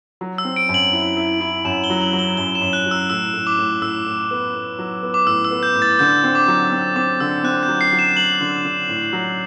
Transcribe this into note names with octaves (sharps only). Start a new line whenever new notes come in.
F#3
E6
C4
D7
F#2
F#7
E4
E4
E4
F#2 E7
G7
F#3
F#7
F#3
G7
F#2 G7
E7
F#2
F#6
F#3
E6
A2 E6
A2
D6
A2
A2 E6
A2
B3
B3
F#3
B3
D6
A2 E6
E6
B3
G6
A2
A6
D3 G6
C4
D6
F#3
C4
C4 D6
D3 E6
C4 F#6
G6
F#3
C7
F#3
E7
F#3 F#7
D3
D3
A2
F#3